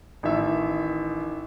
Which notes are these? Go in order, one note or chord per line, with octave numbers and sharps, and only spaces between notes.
A1 D#3 E5